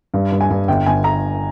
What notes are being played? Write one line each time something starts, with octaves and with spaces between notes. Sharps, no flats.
G2
G2
G#5
G2
G1 G5
G1 G#5
A#5